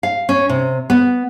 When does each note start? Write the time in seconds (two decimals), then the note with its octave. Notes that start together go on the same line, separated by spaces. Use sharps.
0.03 F5
0.29 C#4
0.50 C3
0.90 B3